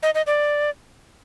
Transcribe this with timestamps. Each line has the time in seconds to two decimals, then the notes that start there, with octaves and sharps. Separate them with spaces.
0.03 D#5
0.15 D#5
0.27 D5